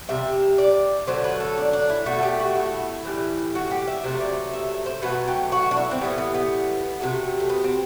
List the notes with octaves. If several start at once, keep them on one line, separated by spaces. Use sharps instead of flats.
C3 G3 E5
D5
D3 F#3 A3 C5
B4
A4
D4
D4
E4
B2 A3 F#4
A4
G4
F#4
E4
A2 E3 G3
F#4
G4
E5
C3 F#3 A3 C5
D5
E5
C5
B2 F#3 A3 B4
G4
F#4
D4
E4
C4
A2 E3 G3 B3
B3
B3
C3 F#3 A3
A3
B3
C4